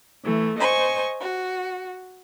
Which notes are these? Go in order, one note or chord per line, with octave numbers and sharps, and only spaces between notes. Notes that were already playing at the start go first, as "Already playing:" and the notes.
E3 A3
C5 D#5 G#5 C#6
F#4